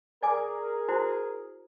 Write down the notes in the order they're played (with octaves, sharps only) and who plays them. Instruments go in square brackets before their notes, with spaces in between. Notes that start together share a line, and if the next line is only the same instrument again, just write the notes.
[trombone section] G#4 A#4 [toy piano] D5 G#5 D6
[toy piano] E4 F#4 C5